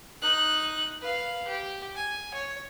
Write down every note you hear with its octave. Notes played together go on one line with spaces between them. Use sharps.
D#4 F#6
B4 F5
G4
G#5
C#5